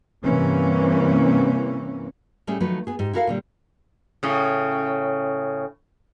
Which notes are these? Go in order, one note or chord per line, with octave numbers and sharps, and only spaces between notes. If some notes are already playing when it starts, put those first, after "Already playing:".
G2 C3 E3 A#3 C4 C#4
A2 G3 A3 C#4 G#4
D#3 F3 F#3 A3 B4
B3 G#4
G#2 G4
E4 F#4 A4 A#4 E5 F5
A#2 D3 G3
A2 C#3